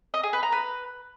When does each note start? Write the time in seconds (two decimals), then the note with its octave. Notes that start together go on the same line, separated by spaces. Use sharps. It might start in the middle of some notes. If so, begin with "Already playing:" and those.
0.14 D#5
0.23 G#4
0.33 B4
0.43 A#5
0.52 B4